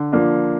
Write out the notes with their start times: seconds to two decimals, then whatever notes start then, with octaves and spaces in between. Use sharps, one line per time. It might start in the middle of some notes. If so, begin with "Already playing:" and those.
Already playing: D3
0.12 F3 A#3 D4